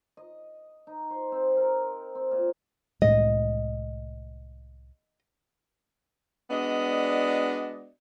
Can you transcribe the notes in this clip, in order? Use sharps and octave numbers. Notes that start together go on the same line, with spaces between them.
D#5
D#4
C5
C4
A#4
C4
A#2
C2 A2 G#3 D#5
G#3 B3 D4 F#4 D5 D#5